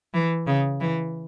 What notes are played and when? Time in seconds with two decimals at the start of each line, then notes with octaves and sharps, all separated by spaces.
0.14 E3
0.47 C#3
0.81 E3